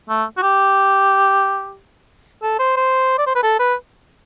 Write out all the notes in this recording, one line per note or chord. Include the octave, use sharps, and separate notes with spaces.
A3
F#4
G4
A4
C5
C5
D5
C5
B4
A4
B4